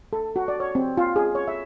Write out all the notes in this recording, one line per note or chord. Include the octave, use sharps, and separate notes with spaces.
A4
F#4
D5
C#5
C4
F4
G#4
C#5
E5